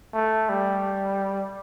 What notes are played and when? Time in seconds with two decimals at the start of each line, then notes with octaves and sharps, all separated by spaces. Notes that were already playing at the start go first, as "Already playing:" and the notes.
0.14 A3
0.49 G3